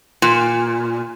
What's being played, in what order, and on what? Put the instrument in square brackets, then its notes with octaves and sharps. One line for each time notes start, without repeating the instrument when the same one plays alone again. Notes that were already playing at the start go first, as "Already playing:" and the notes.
[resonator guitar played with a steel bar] A#2